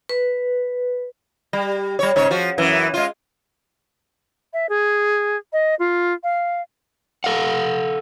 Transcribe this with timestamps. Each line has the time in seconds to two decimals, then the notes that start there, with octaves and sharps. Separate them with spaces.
0.09 B4
1.53 G3
1.99 G3 C#5
2.16 G#2 C#3 C#5
2.31 F3 F#4
2.58 F#2 E3
2.94 G#3 F4
4.53 E5
4.69 G#4
5.53 D#5
5.79 F4
6.23 F5
7.24 A4 F5 F#5